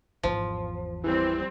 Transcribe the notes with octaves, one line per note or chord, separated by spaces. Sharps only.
G#1 E2 F3
E3 G3 C4